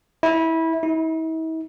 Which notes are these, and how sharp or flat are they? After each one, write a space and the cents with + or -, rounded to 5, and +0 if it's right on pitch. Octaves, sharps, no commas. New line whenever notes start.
E4 -20
E4 -45